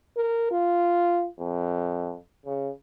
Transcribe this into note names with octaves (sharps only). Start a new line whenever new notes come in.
A#4
F4
F2
C#3